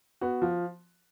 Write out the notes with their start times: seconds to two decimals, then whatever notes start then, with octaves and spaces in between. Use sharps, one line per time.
0.21 B3 F#4
0.42 F3